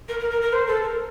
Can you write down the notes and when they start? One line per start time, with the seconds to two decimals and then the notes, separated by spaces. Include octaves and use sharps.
0.09 A#4
0.19 A#4
0.30 A#4
0.42 A#4
0.53 C5
0.67 A4
0.82 A#4